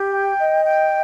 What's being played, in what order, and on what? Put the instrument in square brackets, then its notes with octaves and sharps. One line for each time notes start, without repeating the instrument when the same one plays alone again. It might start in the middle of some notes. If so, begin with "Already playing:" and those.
Already playing: [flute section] G4
G5
D#5
G5